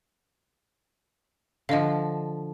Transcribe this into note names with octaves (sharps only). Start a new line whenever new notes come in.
D3 F3 D#5 F5